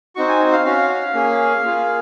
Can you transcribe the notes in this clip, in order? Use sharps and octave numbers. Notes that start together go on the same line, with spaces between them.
C4 D#4 F#4 C#6
G#5
F5
C#4 F#4 F5
F5
A#3 C#4 G#4
A#3 F4 G#4